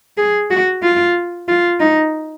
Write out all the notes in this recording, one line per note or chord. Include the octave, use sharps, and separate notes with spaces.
G#4
F#4
F4
F4
D#4